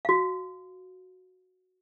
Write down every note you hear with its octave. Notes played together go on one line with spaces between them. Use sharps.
F#4 F5